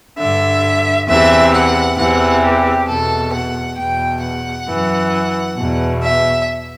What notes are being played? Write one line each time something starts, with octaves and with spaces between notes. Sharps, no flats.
G2 D3 E5
E2 C3 E3 E5
F#5
E2 C3 E3 F#5
G4
E2 B2 A4
F#5
E2 B2 G5
F#5
F#2 E3
E2 B2
E5